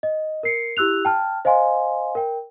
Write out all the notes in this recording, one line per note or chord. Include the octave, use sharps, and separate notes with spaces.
D#5
A#4 C7 C#7
E4 G4 E6 F#6 F7
G5 A5 F6
C5 D#5 F5 G#5 C6
A#4 G5